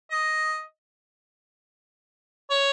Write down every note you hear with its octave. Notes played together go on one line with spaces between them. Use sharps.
D#5
C#5